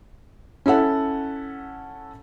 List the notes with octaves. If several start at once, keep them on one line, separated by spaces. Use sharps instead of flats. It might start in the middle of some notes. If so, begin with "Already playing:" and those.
C#4 E4 A4 F#5